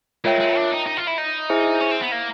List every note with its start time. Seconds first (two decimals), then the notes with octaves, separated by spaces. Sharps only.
0.24 G#3 F4 A#4 C#5 E5 G5
0.40 G#3
0.56 D4
0.71 D#4
0.87 D#4
0.97 F4
1.07 E4
1.18 D#4
1.50 E4 G#4 C5 E5 G#5
1.81 C#4
1.92 C4
2.01 B3
2.12 A#3